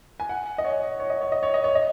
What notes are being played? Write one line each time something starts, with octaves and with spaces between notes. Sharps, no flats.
G#5
F#5
D#5
C#5
C#5
D#5
C#5
D#5
C#5
D#5
C#5
D#5